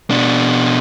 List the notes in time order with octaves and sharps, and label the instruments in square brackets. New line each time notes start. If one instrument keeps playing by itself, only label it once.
[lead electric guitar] B2 D4